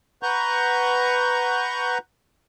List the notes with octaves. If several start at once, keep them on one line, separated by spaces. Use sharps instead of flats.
B4 F#5 A#5 C#6 G6